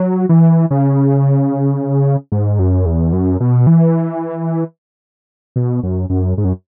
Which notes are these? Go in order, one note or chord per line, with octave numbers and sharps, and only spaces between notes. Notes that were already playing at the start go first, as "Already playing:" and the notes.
Already playing: F#3
E3
C#3
G#2
F#2
E2
F#2
B2
E3
B2
F#2
F#2
G#2
F#2